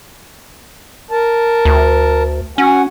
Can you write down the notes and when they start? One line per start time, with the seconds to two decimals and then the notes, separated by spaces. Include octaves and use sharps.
1.11 A#4 A5
1.65 D2
2.58 C#4 F#4 F#5 G#5